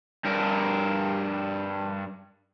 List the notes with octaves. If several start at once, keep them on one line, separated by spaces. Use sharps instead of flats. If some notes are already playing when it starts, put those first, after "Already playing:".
G2 A#4